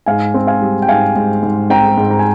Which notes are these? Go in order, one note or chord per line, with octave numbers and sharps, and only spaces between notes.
G#2 F5 G#5
C4
F5 G#5
G3
G5
G#2 F5 G#5
G#2
G#2
C4 G5 A#5
G#2
A#5
G#5